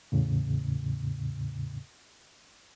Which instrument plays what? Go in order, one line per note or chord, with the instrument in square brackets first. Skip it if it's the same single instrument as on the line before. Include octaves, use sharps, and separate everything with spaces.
[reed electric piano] E2 A2 C#3